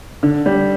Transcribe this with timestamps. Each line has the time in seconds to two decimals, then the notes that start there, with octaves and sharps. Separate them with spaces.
0.23 D3
0.46 G3